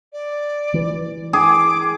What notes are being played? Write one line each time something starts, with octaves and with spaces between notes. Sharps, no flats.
D5
E3
G#4 D6